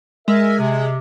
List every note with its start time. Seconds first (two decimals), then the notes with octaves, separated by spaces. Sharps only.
0.28 G#3 A#4 E5
0.59 C3